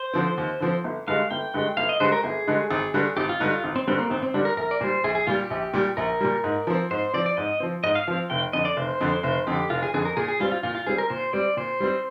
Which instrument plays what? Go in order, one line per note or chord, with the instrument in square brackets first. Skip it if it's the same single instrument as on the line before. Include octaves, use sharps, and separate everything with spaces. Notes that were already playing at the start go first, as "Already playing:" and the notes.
Already playing: [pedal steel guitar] C5
[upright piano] D3 F3 C4
D#2
D3 F3 C4
G1
[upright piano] G2 D3 G#3 [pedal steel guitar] F5
[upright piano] G1 [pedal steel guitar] G5
[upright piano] G2 D3 G#3
[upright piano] G1 [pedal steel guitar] F5
[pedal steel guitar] D#5
[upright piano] G2 D3 G#3 [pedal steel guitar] C5
[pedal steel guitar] A#4
[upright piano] G1 [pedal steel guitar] G#4
[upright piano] G2 D3 G#3
G#1
G2 D3 G3
[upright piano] G#1 [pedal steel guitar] G4
[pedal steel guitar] F4
[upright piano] G2 D3 G3 [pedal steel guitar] D#4
[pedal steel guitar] F4
[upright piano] G#1
[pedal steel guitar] C4
[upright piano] G2 D3 G3 [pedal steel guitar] C4
[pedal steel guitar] A#3
[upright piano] G#1 [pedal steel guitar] C4
[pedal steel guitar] C4
[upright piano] G2 D3 G3 [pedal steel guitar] D4
[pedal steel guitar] A#4
[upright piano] A#1 [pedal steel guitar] A#4
[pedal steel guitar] D5
[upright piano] A#2 G3 [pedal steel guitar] C5
[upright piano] A#1 [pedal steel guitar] G#4
[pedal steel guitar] G#4
[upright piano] A#2 G3 [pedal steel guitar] F4
[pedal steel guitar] G4
[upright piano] A#1
A#2 G3
[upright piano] A#1 [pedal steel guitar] A#4
[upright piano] A#2 G3
G#2
F3 C4
[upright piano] G#2 [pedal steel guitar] C5
[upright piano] F3 C4 [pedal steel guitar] D5
[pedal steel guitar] D5
[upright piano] G#2 [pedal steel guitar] D#5
[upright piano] F3 C4
[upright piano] G#2 [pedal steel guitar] D#5
[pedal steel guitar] F5
[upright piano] F3 C4 [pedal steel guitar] F5
[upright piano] F1 [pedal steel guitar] G5
[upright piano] F2 D3 [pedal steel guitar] D#5
[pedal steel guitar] D5
[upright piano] F1 [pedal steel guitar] C5
[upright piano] F2 D3
[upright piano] F1 [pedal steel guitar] C5
[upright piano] F2 D3 [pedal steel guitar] G4
[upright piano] F1 [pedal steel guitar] F4
[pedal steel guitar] G#4
[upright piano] F2 D3 [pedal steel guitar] G#4
[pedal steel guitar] A#4
[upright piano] A#2 [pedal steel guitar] G#4
[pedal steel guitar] G#4
[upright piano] G3 C4 [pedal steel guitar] F4
[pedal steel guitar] F4
[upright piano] A#2 [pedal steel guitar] F4
[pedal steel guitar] F4
[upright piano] G3 C4 [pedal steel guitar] G#4
[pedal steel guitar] A#4
[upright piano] A#2 [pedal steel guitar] C5
[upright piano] G3 C4 [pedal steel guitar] D5
[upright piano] A#2 [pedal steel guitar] C5
[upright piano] G3 C4